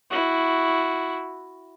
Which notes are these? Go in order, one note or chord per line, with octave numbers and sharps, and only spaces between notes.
E4 F#4